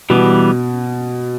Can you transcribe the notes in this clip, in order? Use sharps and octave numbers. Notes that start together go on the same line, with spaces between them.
B2 E3 G3 B3